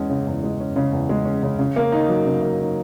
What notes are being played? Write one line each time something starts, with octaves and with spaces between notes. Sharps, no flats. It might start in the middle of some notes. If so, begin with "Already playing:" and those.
Already playing: E2 G#3 C#4
C#3
E2
G#3
C#4
C#3
E2
G#3
C#4
C#3
C#3
A#3
D#4
F#3
C#3
A#3
D#4